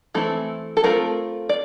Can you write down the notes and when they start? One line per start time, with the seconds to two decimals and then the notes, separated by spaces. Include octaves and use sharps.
0.14 E3 A3 C4 E4 A4
0.77 A4
0.84 A3 C4 F4 A#4
1.49 D5